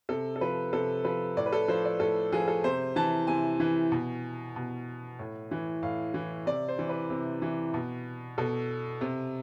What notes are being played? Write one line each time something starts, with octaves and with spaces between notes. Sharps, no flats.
C3 A4
A4
F3 B4
C3 A4
F3 B4
A2 D5
B4
A4
F3 C5
D5
A2 A4
F3 G#4
A4
C3 C5
E3 A5
C3 G#5
E3
B2
B2
A2
E3
A2 F5
E3
C3 D5
C5
E3
B4
C3
E3
B2
B2 A4
C3